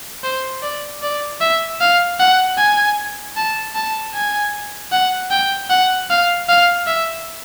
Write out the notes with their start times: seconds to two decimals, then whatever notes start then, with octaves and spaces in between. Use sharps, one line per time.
0.23 C5
0.62 D5
1.03 D5
1.41 E5
1.81 F5
2.19 F#5
2.58 G#5
3.37 A5
3.75 A5
4.14 G#5
4.92 F#5
5.31 G5
5.70 F#5
6.10 F5
6.49 F5
6.87 E5